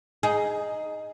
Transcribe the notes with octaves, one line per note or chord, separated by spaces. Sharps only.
D#4 G#4